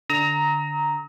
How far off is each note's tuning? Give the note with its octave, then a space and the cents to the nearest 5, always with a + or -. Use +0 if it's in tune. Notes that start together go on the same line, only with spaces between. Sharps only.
D3 +0 A#5 +0 D#6 +45